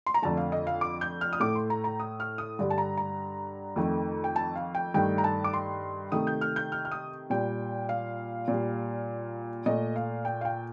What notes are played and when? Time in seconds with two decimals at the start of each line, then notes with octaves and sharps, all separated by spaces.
0.06 C6
0.14 A#5
0.22 F2 D3 A3 A5
0.37 F5
0.52 D#5
0.67 F5
0.81 D6
1.01 G6
1.21 F6
1.33 D#6
1.40 A2 A3 D6
1.55 C6
1.70 A#5
1.84 A#5
2.00 D#6
2.20 F6
2.38 D#6
2.59 G2 D3 G3
2.70 A5
2.78 A#5
2.98 A#5
3.76 F2 D#3 A3
4.24 G5
4.36 A5
4.56 F5
4.75 G5
4.94 G2 D#3 A3 G5
5.18 A#5
5.24 A5
5.44 D6
5.53 C6
6.12 C3 D#3 A3 D#6
6.27 G6
6.41 F6
6.56 G6
6.72 F6
6.85 F6
6.91 D#6
7.30 A#2 G3 G5
7.89 F5
8.48 A#2 G3
9.66 A#2 A3 D#5
9.96 F5
10.25 G5
10.41 F5
10.45 G5